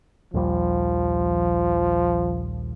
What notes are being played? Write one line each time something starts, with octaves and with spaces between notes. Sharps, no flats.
A#1 D#2 F3 G3